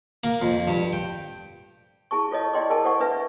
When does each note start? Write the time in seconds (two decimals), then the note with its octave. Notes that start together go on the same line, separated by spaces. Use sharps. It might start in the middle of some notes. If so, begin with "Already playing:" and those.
0.24 A#3
0.42 F2
0.68 G2
0.93 G5
2.11 E4 G#4 A5 C#6
2.31 F4 A4 C#5 D#5 A5
2.53 E4 D5 D#5 G5 C6 D6
2.70 G#4 A#4 G#5 A5
2.84 A4 C5 F#5 C#6
3.00 D4 B4 E5